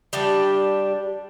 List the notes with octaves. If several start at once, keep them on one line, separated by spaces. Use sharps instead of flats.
G3 D4 G4